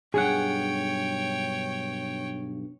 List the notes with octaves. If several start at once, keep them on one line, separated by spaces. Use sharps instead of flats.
B1 G2 G#4 C#5 F#5 G5